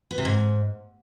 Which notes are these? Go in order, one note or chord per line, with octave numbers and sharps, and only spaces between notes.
B3
C3
G#2